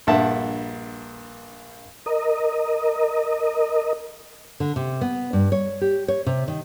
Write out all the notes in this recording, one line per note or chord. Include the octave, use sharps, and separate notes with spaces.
A#1 G2 E5 F#5 A5
A#4 D#5
D3
C3
B3
G2
C#5
G4
C#5
C3
D#3